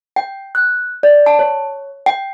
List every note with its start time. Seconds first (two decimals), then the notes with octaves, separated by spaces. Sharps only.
0.16 G5
0.55 F#6
1.03 D5
1.26 A5
1.39 C#5
2.06 G5